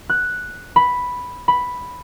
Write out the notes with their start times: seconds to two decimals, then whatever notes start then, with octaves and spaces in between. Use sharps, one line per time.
0.10 F#6
0.76 B5
1.48 B5